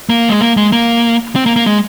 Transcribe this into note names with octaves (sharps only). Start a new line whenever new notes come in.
A#3
G#3
A#3
G#3
A#3
C4
A#3
A#3
G#3